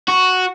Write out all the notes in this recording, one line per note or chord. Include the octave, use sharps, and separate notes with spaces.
F#4